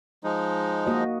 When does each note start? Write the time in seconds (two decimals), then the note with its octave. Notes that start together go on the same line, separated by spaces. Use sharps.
0.24 F3 G#3 D#4
0.87 A#3 F#4 D#5